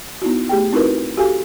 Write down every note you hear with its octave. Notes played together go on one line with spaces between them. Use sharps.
B3 D#4 E4 F#4
A3 G4 G#4 G5
C4 D#4 E4 F#4 A#4 B4
F#4 G4 A4 F5 G#5